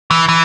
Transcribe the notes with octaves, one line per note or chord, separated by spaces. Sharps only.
E3
E3